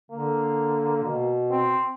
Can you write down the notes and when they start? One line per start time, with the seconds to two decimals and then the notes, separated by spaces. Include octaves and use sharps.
0.11 D3 A#3
1.04 B2
1.51 C4